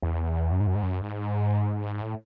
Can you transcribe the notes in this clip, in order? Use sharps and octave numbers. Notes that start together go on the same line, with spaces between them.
E2
F#2
G#2
F#2
G#2
F#2
G#2
A2